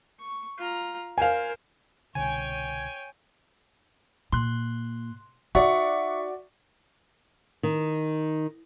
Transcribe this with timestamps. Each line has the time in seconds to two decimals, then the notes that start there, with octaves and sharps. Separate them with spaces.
0.19 C#6
0.58 F4 A#5
1.18 A#4 C5 F5 G#5
2.15 C2 B2 D3 C#5 G5 G#5
4.32 A#2 C6 F#6
5.55 D#4 F#4 D5 E5 F#5 C#6
7.63 D#3